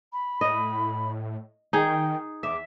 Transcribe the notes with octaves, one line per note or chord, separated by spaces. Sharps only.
B5
A2 D#5
D#3 D#4 G#4 G5
E2 E5 D6